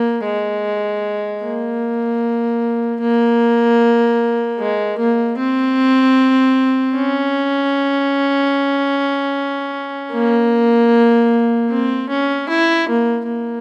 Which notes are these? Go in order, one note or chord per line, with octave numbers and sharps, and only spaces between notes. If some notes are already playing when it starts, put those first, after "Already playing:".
Already playing: A#3
G#3
A#3
A#3
G#3
A#3
C4
C#4
A#3
C4
C#4
E4
A#3
A#3